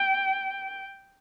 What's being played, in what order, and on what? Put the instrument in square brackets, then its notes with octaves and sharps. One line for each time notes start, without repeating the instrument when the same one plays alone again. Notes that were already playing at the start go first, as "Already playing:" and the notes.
Already playing: [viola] G5